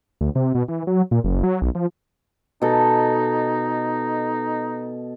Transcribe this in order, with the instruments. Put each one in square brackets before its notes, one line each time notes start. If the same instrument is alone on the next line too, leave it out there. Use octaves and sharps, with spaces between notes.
[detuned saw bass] D2
C3
B2
E3
F#3
A#2
F#1
F#3
B1
F3
[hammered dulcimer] B2 A4 [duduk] D#4